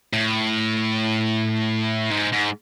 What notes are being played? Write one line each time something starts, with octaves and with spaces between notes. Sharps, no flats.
A2
G#2
G#2